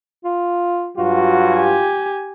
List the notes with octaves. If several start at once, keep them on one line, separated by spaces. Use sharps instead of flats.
F4
G2 F#3 F4 F#4
G4 G#5